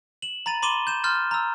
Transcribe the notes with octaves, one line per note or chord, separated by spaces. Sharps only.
E7 F#7
A#5 B5 A6 D#7
B5 C6 D6 D#7 E7 G7
G6 E7
C6 F6 G6 A6
A#5 E6